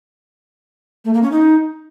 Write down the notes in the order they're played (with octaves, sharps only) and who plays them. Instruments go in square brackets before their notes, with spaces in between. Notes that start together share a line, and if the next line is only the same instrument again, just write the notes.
[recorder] A3
A#3
C#4
D#4